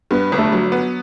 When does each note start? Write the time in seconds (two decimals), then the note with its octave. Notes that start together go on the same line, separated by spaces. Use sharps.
0.11 G2 B3
0.32 G1
0.38 A3
0.52 F#3
0.72 B3